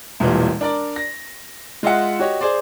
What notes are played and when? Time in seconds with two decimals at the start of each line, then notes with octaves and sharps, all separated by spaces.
0.20 E1 B1 A#2 E3 G3
0.61 D4 A#4 D5
0.96 A#6
1.83 G#3 F4 D#5 E5 F#5
2.19 F#4 G4 C#5 D#5
2.41 G#4 C5 D5